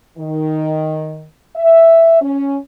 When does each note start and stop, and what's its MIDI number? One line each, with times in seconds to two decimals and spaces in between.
0.18 1.25 51
1.56 2.19 76
2.21 2.57 61